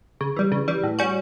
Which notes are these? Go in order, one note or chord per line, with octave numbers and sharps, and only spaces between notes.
C#3
E3 G3
C#3
E3 G3
A2
G3 C#4 F#4